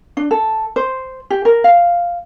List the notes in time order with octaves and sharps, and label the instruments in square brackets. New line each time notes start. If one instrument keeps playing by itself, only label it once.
[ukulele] D4
A4
C5
G4
A#4
F5